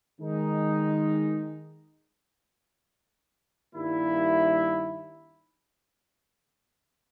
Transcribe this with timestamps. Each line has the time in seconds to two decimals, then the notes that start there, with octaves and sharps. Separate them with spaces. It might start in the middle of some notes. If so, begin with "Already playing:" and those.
0.20 D#3 G#3 D#4
3.75 G2 D#3 G3 A#3 E4